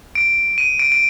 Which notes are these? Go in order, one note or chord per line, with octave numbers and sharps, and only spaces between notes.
D7
D#7
D7
D7